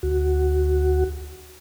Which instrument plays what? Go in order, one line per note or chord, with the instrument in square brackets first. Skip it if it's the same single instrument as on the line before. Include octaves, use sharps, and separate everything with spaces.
[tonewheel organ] D2 F#4